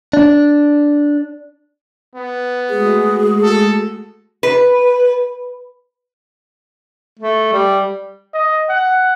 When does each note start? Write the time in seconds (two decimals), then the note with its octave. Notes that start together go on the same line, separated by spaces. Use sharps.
0.13 D4
2.15 B3
2.69 G#3 A3 F#4 G#4
3.43 A4
4.43 B4
7.19 A3
7.53 G3
8.34 D#5
8.69 F#5